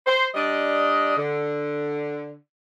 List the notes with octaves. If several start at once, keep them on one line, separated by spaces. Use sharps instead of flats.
C5
G3 D4 D#5
D3